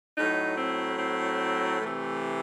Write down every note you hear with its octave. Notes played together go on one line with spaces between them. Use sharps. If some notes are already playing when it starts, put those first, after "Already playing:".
A2 F#3 D#4
C4
C4
C3 E3 A3